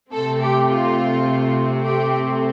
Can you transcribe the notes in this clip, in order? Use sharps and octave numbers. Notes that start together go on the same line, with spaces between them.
C3 A3 C4 A4
G4
F4
G4